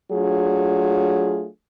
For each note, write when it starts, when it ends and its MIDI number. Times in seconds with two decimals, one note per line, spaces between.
0.11 1.47 54
0.11 1.47 57
0.11 1.47 62
0.11 1.47 65
0.11 1.47 68